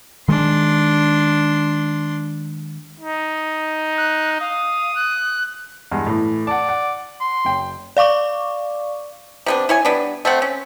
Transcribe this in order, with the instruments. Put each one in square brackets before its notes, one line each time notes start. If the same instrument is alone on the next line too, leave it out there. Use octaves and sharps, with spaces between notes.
[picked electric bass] D#3 G#3 [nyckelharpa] D4 C6
[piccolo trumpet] D#4
[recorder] F#6
[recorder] F5 [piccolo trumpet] D#6
[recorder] F#6
[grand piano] E2 G2 G#3
A2 E3
[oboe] D5 [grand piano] F#5 A5
[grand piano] F#5
[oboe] C6
[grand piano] F#1 G5
[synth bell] D5 F5 C#6 D6
[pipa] C3 B3 D4
E4 C#5 G#5
G3 B3 D4
A3 C4 F#5
C#4